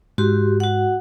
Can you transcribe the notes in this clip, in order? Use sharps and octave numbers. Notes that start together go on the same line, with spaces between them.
G#2 F#4 G4 C6
F#4 F#5